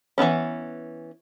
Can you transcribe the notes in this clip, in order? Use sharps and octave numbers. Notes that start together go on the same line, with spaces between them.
E3 F#3 B3 C#4